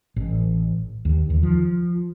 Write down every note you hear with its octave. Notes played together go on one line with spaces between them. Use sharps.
A1
D#2
D#2
F3